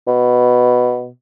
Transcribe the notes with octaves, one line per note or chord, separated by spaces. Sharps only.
B2